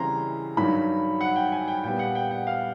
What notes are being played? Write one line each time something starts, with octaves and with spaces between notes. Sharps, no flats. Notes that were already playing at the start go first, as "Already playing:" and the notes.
Already playing: C#3 E3 G3 C4 A#5 C6
G2 D#3 F#3 B5
F#5
G5
G#5
G5
A#2 G3 B3 G5
F#5
G5
F#5
F5